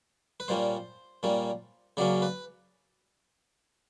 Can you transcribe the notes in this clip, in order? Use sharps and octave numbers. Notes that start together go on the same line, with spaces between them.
B4
A#2 G3 A#3 C#4 C5
A#2 G3 A#3 C#4
C#3 F#3 A#3 C#4 D5
B4